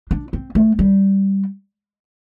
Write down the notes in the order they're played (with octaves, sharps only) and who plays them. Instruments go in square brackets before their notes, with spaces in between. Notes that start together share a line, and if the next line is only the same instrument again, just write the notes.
[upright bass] D4
C4
A3
G3